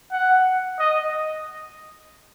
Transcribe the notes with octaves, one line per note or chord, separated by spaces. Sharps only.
F#5
D#5